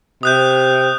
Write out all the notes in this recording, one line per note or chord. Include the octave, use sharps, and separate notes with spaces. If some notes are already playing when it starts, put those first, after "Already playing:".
C3 D#6 F#6 G6